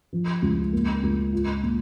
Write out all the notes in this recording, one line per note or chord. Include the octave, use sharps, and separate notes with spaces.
F3
C#2
A#3
C#2
F4
A#2